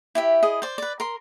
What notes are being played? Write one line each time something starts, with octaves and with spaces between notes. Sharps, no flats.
E4 G4 E5
E4 G#4 D#5
C5 D5
B4 D5
A#4 C6